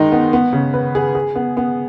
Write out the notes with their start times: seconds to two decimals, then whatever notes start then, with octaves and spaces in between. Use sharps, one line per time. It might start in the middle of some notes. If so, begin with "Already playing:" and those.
Already playing: D#3 G#3 D#4
0.12 B3
0.33 B3
0.53 C#3
0.74 B4
0.95 G#4
1.15 G#4
1.36 B3
1.57 B3